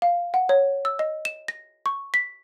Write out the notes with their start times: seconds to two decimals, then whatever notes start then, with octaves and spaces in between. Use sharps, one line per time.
0.02 F5
0.34 F#5
0.49 C#5
0.85 E6
0.99 D#5
1.25 E7
1.48 A#6
1.86 C#6
2.14 B6